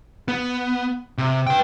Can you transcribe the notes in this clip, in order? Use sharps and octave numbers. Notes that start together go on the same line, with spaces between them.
B3
C3
B4 G5